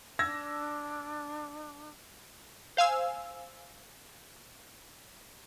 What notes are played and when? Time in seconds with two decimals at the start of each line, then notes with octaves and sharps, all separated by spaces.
0.19 D4 E6 G#6 A#6
2.77 C5 F5 G#5 E6